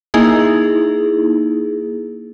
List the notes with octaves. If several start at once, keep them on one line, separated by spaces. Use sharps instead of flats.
A#3 D#4 E4 G#4